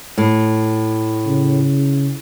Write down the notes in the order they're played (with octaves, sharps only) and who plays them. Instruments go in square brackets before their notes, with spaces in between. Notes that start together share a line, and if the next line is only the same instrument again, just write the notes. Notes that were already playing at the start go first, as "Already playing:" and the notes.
[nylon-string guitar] A2
[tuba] C#3